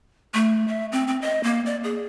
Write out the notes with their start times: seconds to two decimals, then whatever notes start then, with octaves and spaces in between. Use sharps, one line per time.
0.34 A3
0.68 E5
0.92 C4
1.07 C4
1.22 D#5
1.43 A#3
1.66 D5
1.84 G#4